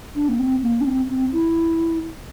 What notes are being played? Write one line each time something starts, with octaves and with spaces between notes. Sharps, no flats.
D4
A#3
C4
A#3
D4
C4
C4
E4